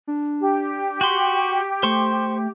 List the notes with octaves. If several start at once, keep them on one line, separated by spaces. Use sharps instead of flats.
D4
G4
F#4 C6 C#6
A3 C5 C6 C#6